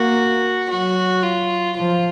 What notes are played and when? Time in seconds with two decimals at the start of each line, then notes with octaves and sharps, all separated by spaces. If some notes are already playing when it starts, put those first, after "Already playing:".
Already playing: A#3 F#4
0.70 F#3 F#4
1.23 F4
1.77 F3 F4